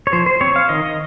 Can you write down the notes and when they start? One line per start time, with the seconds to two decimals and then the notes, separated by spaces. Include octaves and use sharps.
0.07 C#5
0.13 F3 C5
0.26 C5
0.41 C4 C#5
0.56 F5
0.69 D#3 D#5